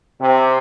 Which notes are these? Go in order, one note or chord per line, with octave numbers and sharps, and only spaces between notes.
C3